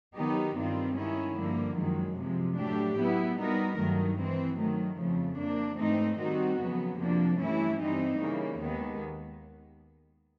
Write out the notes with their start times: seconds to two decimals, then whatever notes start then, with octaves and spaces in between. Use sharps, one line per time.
0.17 D#3 F#3 B3 D#4 G4
0.57 G2 D#3 G3 C4 F4
0.97 D#3 G#3 C#4 E4
1.38 G2 D3 F3 A#3
1.78 F#2 D#3 G#3
2.18 C3 F3 G#3
2.58 A2 F#3 A3 D4 G4
2.98 F#3 B3 E4
3.38 G3 B3 D#4 F#4 A#4
3.79 G2 D#3 F#3 A3
4.19 E3 G#3 C4
4.58 D#3 F#3 A3
4.98 F2 C#3 F3 A3
5.38 F3 A#3 D4
5.79 G#2 E3 A3 C4 D#4
6.19 D#3 G3 C4 D#4 F#4
6.60 F2 C#3 F#3 B3
6.99 F2 C3 F3 A#3 D4
7.39 G2 E3 A3 C#4 E4
7.79 G2 E3 G3 C4 D#4
8.19 C#3 E3 G3 A#3
8.60 D#2 D#3 G#3 B3